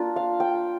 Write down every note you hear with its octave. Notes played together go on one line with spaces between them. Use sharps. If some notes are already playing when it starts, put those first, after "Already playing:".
Already playing: A#3 D4 F4
F5
G5